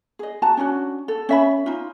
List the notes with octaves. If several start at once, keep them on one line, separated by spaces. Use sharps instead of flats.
G#4 D#5
F#4 A5 A#5
C#4 D4 E4 F#4
A4
C#4 E5 B5
D#4 F4